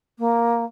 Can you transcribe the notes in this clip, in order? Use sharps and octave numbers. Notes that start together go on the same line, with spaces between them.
A#3